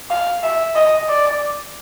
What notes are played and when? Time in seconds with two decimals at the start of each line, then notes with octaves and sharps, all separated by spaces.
0.10 F5
0.43 E5
0.76 D#5
1.09 D5